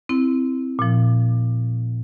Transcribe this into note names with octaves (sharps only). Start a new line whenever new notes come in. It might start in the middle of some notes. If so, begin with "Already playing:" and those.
C4 E4
A#2 F3